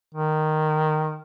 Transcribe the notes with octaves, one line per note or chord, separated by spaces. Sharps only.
D#3